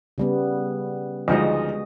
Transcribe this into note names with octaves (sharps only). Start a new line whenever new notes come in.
C#3 G3 B3
D2 F3 G#3 D#4 F#4 D#5